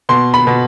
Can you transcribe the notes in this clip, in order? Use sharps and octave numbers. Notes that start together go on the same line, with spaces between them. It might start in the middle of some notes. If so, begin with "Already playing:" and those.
B2 C6
B5
B2